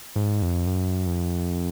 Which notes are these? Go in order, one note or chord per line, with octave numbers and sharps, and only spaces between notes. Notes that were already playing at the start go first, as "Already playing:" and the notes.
G#2
F2
F#2
F2